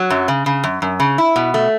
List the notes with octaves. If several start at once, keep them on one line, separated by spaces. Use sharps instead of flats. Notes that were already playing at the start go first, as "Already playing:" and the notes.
Already playing: F#3
F#2
C#3
C#3
F#2
F#2
C#3
E4
B2
A3